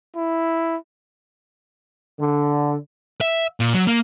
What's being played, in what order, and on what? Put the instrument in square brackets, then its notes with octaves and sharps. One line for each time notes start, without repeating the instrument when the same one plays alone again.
[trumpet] E4
[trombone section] D3
[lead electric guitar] E5
A#2
F#3
A#3